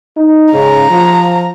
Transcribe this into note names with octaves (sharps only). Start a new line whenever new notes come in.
D#4
G#2 C#3 A#5
F3